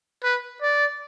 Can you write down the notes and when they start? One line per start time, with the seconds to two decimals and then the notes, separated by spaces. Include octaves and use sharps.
0.24 B4
0.62 D5